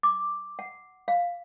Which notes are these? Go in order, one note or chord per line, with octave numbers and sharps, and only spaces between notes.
D6
F#5
F5